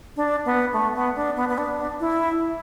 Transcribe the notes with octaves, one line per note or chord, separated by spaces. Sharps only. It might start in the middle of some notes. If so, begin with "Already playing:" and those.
D4
B3
A3
B3
D4
B3
B3
D4
E4